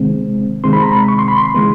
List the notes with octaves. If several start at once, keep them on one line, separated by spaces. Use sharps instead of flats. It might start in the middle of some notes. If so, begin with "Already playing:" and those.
Already playing: C3 D#3 G#3 C4
C3 D#3 G#3 C4 C6
B5
A#5
B5
C#6
C6
B5
C6
C#3 E3 G#3 B3